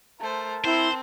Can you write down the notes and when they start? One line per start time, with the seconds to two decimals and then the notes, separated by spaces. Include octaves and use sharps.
0.20 A3 A#4 C5 A5
0.64 C4 E4 C5